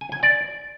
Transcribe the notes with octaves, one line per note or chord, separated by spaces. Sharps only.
G#5
G#5
D5